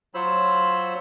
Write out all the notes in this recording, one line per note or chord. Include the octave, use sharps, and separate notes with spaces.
F#3 F4 C5 C#5 B5 E6